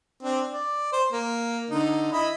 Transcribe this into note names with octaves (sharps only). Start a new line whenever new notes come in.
C4 D4
D5
C5
A#3
D3 D#4
E4 D#5 B5